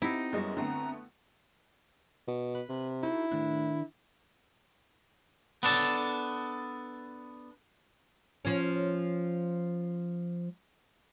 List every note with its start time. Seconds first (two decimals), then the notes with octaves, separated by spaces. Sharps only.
0.02 C4 D#4 E4 G4 F#5
0.33 F#2 G3 G#3 B3 F#4 D#5
0.57 D3 A3 B3 C4 A#5
2.28 B2
2.55 B4
2.69 C3
3.03 D#4 E4 F#4 A4
3.32 A2 D#3 D4
5.63 B3 D4 A4
8.45 F3 C#4